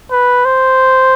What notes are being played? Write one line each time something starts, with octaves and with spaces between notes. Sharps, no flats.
B4
C5